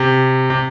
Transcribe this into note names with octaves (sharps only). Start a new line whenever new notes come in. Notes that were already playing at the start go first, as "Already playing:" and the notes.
Already playing: C3
C3